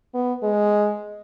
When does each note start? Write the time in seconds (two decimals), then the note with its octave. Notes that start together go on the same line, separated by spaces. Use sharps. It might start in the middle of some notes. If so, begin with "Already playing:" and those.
0.14 B3
0.43 G#3